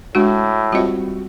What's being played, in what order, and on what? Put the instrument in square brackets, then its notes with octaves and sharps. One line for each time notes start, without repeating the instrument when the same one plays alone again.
[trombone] A2 [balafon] G#3 D4 F#4
[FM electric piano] G3 C4 F#4 [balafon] F4 D#5